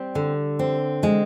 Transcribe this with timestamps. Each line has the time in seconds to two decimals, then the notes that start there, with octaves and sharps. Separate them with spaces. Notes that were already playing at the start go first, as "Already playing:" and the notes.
Already playing: G3 C4
0.15 D3
0.59 C4
1.03 G#3